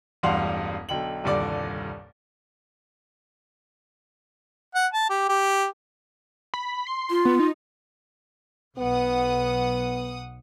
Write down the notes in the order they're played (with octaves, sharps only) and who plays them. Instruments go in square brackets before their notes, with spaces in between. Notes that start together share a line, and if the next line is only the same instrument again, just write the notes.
[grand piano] E1 A1 G2 F5 F#5 C6
B1 D3 G5 F#7
D#1 C2 G2 D3 D5 D6
[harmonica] F#5
A5
G4
G4
[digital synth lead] B5
C6
[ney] F4
[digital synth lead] B3
D#4
[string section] B1 F#5 D#6 [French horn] B3